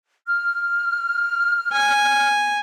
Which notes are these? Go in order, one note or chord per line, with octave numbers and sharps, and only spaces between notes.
F6
G#5